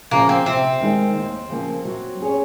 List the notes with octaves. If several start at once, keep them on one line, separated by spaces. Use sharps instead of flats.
C#3 F3 A#3
C4
C3 C4
D#3 G#3 D#4 A#4
D#2
C#3 F3 A#3
F#3
C#4 G#4 C#5